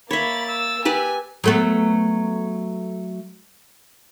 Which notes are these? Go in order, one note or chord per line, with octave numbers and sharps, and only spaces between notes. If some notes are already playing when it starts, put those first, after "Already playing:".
A#3 C#5 E5 B5 A6
E6
G4 B4 D5 G#5
F#3 A3 B3